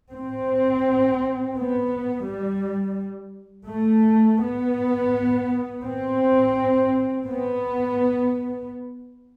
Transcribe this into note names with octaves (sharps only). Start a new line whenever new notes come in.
C4
B3
G3
A3
B3
C4
B3